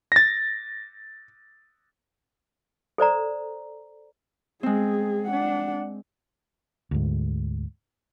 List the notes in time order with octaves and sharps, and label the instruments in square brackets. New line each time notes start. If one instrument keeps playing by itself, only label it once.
[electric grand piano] A6 A#6
[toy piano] A4 C5 D5 A#5
[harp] G#3 C4 [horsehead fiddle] G#4
[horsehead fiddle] D4 F#5
[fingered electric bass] D2 G#2